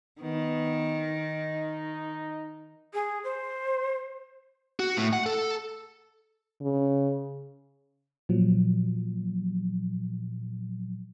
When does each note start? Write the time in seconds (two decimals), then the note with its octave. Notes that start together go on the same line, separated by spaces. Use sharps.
0.22 D#3 B3
1.16 D#4
2.94 G#4
3.24 C5
4.80 F#4
4.97 A2
5.13 F#5
5.26 A4
6.61 C#3
8.29 A#2 F3 F#3